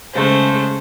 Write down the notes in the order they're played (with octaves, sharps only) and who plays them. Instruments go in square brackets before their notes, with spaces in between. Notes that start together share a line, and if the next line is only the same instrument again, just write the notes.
[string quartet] C#3 G#3 A3 C5